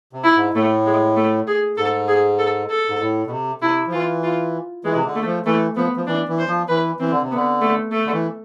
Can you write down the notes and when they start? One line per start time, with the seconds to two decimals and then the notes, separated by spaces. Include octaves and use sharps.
0.13 C3
0.24 E4
0.35 G#2
0.54 A2 A3
0.86 G#3
1.16 A3
1.47 G#4
1.77 G#2 A4
2.08 G#4
2.39 A4
2.70 A4
2.88 G#2
3.01 A2
3.26 B2
3.30 C3
3.62 C3 E4
3.87 F3
3.92 E3 F4
4.23 F4
4.84 E3 G#3
4.95 C3
5.06 D3
5.15 A3
5.25 F3
5.46 E3 A3
5.76 F3 B3
5.97 F3
6.07 E3 D4
6.28 E3
6.38 C5
6.48 F3
6.68 E3 B4
6.99 E3 C4
7.11 D3
7.22 C3
7.31 D3 B3
7.61 A3
7.91 A3
8.05 D3
8.12 E3